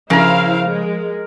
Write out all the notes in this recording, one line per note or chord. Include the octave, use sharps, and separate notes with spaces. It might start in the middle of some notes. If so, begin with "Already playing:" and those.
C#3 F3 E4 A#4 C5 F5 A#5
G#3